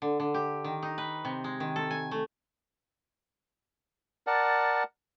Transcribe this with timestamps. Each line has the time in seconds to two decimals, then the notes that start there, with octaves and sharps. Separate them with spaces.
0.02 D3
0.20 D3
0.34 G4
0.64 D#3
0.83 D#4
0.98 B4
1.25 C3
1.44 G#3
1.60 D#3
1.76 A4
1.91 G#5
2.11 A3
4.27 A#4 D5 F#5 A5